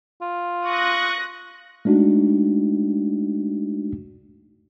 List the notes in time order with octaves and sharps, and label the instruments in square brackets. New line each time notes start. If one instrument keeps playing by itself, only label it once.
[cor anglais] F4
[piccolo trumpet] C#6 [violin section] D#6 F#6 A#6
[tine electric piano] G#3 A3 D4 D#4 F#4